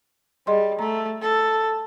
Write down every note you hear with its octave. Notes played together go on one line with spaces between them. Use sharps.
G3 G#4 D#5 C6
A3 A#5
A4